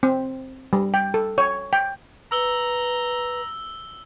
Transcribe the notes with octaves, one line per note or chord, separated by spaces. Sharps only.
C4
G3
G5
A4
C#5
G5
B4 A#5 E6 G7